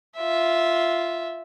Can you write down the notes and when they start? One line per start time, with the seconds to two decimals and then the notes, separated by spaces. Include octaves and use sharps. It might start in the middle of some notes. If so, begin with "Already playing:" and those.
0.18 F4 E5